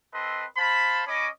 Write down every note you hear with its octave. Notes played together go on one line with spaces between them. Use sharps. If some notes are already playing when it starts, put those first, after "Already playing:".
C4 A4 B4 D#5 C6
C5 F5 A5 B5
C#4 C#5 D#5 B5 D6